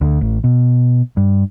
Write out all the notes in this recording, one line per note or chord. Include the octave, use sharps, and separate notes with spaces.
D2
A1
B2
G2